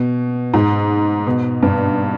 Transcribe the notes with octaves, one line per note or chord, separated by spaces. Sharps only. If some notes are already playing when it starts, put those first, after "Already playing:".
Already playing: B2
G#2
B2
G2